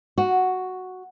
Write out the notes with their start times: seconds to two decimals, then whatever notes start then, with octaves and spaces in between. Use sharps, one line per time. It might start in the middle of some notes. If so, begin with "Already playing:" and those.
0.18 F#4